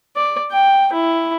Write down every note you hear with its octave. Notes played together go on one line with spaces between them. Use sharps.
D5
G5
E4